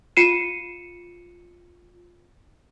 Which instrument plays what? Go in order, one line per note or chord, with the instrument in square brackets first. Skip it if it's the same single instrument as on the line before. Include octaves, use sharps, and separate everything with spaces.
[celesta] F4 C7 C#7 D#7 E7